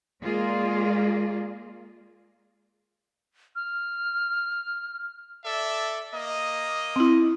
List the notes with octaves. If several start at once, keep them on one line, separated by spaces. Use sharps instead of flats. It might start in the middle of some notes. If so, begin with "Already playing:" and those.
G#3 A#3 F4 G#4 D5
F6
A4 D5 E5
A#3 D#5
C4 E4